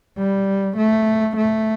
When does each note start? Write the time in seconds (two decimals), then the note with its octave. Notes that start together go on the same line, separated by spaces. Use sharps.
0.18 G3
0.77 A3
1.37 A3